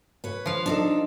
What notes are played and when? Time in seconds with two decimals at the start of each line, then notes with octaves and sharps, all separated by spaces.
0.24 B4 C#5
0.46 F3 F5
0.66 D4 D#4 A4